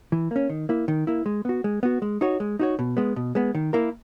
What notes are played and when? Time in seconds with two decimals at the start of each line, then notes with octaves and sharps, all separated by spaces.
0.12 E3
0.31 A#3 C#4
0.49 D#3
0.69 A#3 E4
0.88 D#3
1.07 A#3 E4
1.26 G#3
1.45 B3 F#4
1.64 G#3
1.83 B3 F#4
2.02 G#3
2.21 D#4 F#4 C#5
2.40 G#3
2.59 D#4 F#4 C#5
2.79 B2
2.97 G#3 B3
3.16 B2
3.35 G#3 B3
3.54 D#3
3.73 A#3 E4 A#4